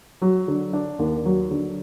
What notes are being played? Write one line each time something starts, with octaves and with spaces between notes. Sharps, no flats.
F#3
D3
D4
D#2
F#3
D3